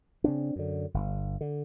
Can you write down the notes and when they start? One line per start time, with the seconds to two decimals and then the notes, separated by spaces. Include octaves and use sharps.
0.24 C#3 C4 D4
0.56 F#2 D3
0.94 G1
1.41 D3